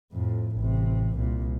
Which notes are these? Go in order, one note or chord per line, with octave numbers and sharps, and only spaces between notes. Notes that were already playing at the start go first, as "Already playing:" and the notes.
F2 A2
A1 C3
C2 A#2